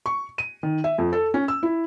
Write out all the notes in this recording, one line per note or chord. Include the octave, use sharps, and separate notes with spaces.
C#6
D#7
D#3
E5
F2
A4
C#4
E6
E4